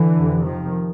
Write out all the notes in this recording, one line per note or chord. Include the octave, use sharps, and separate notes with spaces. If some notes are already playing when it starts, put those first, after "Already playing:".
Already playing: D3 E3
F2 C3
D#3 F3